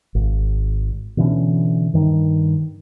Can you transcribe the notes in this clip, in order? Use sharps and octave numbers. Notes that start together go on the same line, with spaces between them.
G#1
B2 D3 E3 C#4
G2 D#3